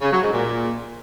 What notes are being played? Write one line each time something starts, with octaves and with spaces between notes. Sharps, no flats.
C#3
F#3
G#2
A#2